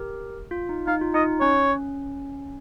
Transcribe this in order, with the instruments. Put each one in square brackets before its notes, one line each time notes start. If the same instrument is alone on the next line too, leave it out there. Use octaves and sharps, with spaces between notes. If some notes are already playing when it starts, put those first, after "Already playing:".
Already playing: [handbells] G4 A#4
F4
D#4
[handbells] D#4 [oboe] F5
[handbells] F4
[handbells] D#4 [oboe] D#5
[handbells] C#4 [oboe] C#5